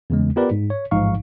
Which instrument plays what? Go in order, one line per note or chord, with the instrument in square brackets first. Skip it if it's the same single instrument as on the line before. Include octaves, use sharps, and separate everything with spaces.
[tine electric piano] E2 C#3 G#3
B3 F4 G4 A#4 B4 D5
G#2
C#5
A1 G#2 F3 D#4 F5 C#6